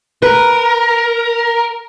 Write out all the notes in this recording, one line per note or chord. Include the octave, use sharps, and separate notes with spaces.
A#4 B4